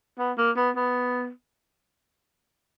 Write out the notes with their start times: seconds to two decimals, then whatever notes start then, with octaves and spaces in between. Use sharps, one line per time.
0.19 B3
0.37 A#3
0.57 B3
0.76 B3